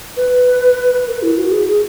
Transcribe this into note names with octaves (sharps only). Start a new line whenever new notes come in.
B4
A#4
E4
F#4
G#4
G#4